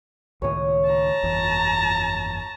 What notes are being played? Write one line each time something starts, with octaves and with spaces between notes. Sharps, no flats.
C#2 A2 D#3 C#5 D#6
A5 A#5
G1 F2 E3